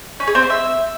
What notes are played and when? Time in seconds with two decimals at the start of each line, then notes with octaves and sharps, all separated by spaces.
0.20 C#4
0.27 G#4
0.35 C4
0.42 C5
0.50 E5